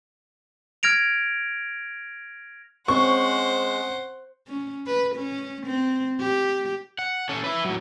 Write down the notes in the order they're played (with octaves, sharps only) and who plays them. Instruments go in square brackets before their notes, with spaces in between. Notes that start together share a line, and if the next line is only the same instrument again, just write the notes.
[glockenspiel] F6 G#6 A#6 D7 F7
[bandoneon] G#3 [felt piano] C4 C#4 [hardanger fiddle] C5 F#5 [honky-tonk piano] C#6
[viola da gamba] C#4
B4
C#4
C4
G4
[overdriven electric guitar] F#5
C#4 A4
B4 E5
A2 F#3